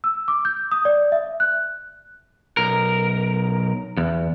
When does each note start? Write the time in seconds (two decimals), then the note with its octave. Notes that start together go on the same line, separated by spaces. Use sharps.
0.04 E6
0.28 D6
0.45 G6
0.72 D#6
0.85 D5
1.12 E5
1.40 F#6
2.57 B1 A#4
3.97 E2